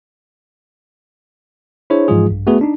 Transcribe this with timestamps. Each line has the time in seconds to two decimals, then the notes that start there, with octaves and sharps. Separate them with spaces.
1.90 D4 E4 G#4 C5 C#5
2.08 G#2 E3 F3 G#3 F4 G#4
2.30 A#1 G2
2.47 A3 B3 F#4 G#4 A4 B4
2.61 D4 D#4